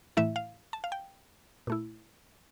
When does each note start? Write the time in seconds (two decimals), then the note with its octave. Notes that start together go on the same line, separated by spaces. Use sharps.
0.17 A2 E3 A3 E4 E5
0.36 F5
0.73 A5
0.84 F5
0.92 G5
1.67 A#2 A3 E4